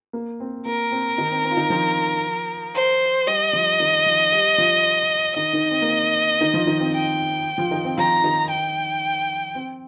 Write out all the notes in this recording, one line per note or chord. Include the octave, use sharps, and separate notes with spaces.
A#3
C4
A#3 A#4
C4
D#3 D#4
C4
C4
F4
D#3 D#4
F3 F4
C5
G3 G4 D#5
F3 F4
D#3 D#4
F3 F4
G3 G4
F3 F4
D#3 D#4 D#5
D#3 D#4
C4
A#3
C4
D#3 D#4
F3 F4
D#3 D#4
C4
G5
F3 F4
D#3 D#4
C4
F3 F4 A#5
D#3 D#4
G5
C4